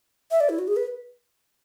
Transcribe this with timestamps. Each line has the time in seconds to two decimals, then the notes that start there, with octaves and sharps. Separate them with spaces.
0.31 E5
0.40 D5
0.49 E4
0.59 F#4
0.68 G#4
0.76 B4